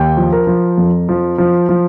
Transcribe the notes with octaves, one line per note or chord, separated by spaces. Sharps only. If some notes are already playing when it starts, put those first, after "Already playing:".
Already playing: D#2 G5
F3
A#4
F3
F2
F3
F3
F3